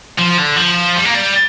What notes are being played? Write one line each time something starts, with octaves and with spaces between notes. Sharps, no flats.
F3
D3
F3
G3
A#3
G3